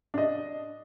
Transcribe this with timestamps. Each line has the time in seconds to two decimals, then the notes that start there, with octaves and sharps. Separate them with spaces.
0.14 D4 D#5